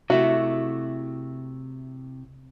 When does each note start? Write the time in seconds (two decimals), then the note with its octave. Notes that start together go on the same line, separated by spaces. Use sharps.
0.10 C3 A3 E4 F#4